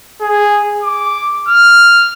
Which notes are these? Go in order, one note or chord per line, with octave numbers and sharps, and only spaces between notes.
G#4
D6
F6